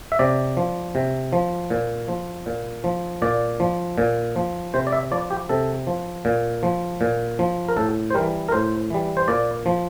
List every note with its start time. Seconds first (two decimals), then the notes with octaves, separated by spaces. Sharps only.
0.12 E5
0.19 C3 D5
0.57 F3
0.95 C3
1.33 F3
1.70 A#2
2.08 F3
2.46 A#2
2.84 F3
3.22 A#2 D5
3.60 F3
3.98 A#2
4.36 F3
4.74 C3 C5
4.87 D5
4.92 E5
5.11 F3 D5
5.31 G4
5.49 C3 A4
5.87 F3
6.25 A#2
6.63 F3
7.01 A#2
7.39 F3
7.68 A#4
7.76 A2 A4
8.10 C5
8.14 E3 G3 A#4
8.49 A#4
8.52 A2 C5
8.90 E3 G3
9.17 C5
9.28 A#2 D5
9.66 F3